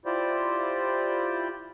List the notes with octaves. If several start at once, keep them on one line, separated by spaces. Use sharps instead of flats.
E4 F4 G4 C5 D5